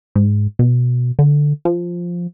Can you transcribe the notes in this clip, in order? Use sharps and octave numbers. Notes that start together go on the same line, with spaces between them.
G#2
B2
D3
F3